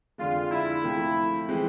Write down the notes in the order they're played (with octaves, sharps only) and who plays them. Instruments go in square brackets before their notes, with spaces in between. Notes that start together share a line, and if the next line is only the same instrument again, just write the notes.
[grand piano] F2 D3 G#3 [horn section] F4
[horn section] E4
[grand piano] C3 F3 A3
E3 G#3 C4